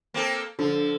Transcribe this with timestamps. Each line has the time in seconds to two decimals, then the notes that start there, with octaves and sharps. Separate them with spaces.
0.14 A#3 C4 A4
0.59 D3 F3